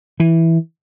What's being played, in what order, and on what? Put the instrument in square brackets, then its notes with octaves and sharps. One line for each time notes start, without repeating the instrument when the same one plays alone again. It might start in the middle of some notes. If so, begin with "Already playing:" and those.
[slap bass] E3